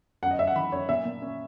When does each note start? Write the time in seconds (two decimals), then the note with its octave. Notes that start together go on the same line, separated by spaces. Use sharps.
0.23 F#2 F#5
0.31 D#5
0.39 F#2 E5
0.47 F#5
0.56 E3 B5
0.72 F#2 C#5
0.89 A#2 E5
1.05 A#2
1.22 C#4